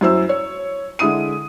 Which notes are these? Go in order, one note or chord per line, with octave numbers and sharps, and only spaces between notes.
F#2 E4 C5 E6
C#5
D3 G#3 E4 D#6 D#7